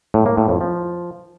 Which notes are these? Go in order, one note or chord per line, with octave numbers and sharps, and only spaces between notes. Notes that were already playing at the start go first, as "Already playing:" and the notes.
A2
A#3
A2
F2
F3